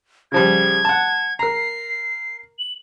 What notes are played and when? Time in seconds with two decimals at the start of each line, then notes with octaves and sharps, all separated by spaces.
0.32 C#3 F3 G3 G#6
0.85 F#5 A5
1.39 A#4 A#5 C7
2.59 F#7